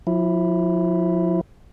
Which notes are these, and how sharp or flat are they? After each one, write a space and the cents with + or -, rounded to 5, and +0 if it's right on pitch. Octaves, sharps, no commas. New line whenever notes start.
F3 +40 E4 +0